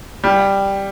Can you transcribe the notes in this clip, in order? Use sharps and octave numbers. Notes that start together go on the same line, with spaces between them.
G3